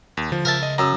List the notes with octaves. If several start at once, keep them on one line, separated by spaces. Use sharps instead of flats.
D#2
D2 F3
C#2 A#4 E5 A5
D#5
F#2 A#5 D#6 E6